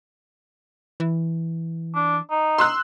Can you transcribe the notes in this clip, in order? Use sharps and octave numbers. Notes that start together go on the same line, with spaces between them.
E3
D4
D#4
C6 E6 F#6